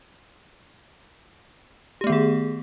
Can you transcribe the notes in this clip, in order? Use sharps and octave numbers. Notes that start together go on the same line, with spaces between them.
D#3 A3 B3 G4 G#4